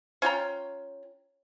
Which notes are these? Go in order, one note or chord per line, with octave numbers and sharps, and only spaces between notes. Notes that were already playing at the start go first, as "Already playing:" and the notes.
C#4 F4 G5 A#5